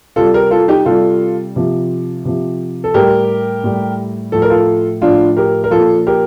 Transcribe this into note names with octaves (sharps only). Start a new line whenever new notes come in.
C3 G3 F4 A4
G4 A#4
F4 A4
D#4 G4
C3 G3 F4 A4
C3 F3
C3 F3
A4
A2 G3 G4 A#4
A2 G3
A2 F3 A4
A#4
F4 A4
A2 F3 D4 F4
G4 A#4
A#4
A#2 F3 F4 A4
G4 A#4